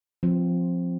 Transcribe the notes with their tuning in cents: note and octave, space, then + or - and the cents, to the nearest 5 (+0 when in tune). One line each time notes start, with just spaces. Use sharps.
F3 +5 C4 +0